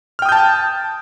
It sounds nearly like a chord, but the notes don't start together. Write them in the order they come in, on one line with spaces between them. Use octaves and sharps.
F6 G5 D#6 G6 A5